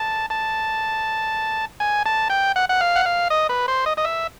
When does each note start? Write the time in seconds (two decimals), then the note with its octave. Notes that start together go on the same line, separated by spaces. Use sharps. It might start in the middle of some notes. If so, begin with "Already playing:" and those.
Already playing: A5
0.30 A5
1.80 G#5
2.06 A5
2.30 G5
2.56 F#5
2.69 F#5
2.81 F5
2.96 F#5
3.06 F5
3.30 D#5
3.49 B4
3.68 C5
3.86 D#5
3.97 D#5
4.05 E5